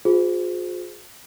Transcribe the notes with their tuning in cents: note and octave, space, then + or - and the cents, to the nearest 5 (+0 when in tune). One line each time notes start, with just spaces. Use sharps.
F4 +45 G#4 +0 C5 -25